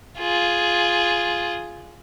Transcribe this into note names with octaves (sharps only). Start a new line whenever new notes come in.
F4 G#4